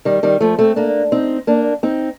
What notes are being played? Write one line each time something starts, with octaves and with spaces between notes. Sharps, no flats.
D#3 G3
D#3 G3
F3 A3
A3 C4
A#3 D4
C4 D#4
A#3 D4
C4 D#4